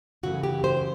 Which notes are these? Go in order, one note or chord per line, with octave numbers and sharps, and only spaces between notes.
F#2 C#3 E3 A3 F#4
G4
C5